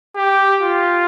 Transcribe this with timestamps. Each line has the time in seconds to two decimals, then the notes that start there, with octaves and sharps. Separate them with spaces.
0.16 G4
0.61 F4